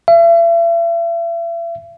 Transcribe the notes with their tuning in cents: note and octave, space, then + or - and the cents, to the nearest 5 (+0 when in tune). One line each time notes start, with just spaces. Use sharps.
E5 +40